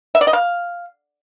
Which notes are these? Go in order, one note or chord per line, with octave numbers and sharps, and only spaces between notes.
E5
D5
D#5
F5